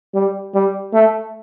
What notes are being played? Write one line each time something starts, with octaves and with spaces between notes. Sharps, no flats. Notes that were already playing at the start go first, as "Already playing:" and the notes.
G3
G3
A3